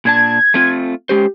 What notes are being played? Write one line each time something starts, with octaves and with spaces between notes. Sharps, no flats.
A#2 D4 A5 G#6
A3 C4 F4
G#3 C#4 G4 C5